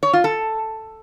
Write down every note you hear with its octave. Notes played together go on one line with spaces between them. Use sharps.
C#5
F4
A4